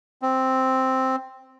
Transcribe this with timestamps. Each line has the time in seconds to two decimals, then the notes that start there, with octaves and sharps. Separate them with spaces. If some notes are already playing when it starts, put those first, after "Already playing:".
0.22 C4